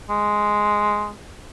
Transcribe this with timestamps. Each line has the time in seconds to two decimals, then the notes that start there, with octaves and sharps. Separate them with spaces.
0.09 G#3